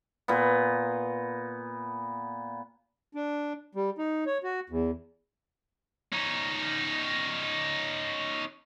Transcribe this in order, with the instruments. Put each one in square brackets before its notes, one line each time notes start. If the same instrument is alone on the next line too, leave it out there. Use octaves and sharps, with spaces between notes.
[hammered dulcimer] A#2 B3
[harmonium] D4
G3
D#4
C#5
F#4
E2
[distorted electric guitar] C#4 D#4